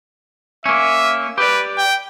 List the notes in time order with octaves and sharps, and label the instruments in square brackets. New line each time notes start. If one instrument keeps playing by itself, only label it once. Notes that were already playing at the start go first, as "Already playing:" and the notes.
[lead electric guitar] A#3 C#4 [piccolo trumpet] E5
[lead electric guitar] G4 D5 [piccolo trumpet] B4
[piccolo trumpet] G5